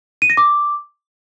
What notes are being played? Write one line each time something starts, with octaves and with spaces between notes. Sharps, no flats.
D#7
A#6
D6